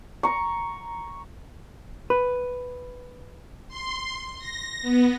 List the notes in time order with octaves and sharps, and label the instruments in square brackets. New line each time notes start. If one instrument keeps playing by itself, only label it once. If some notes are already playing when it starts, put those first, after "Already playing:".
[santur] A#5 C#6
[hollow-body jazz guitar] B4
[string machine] C6
A#6
B3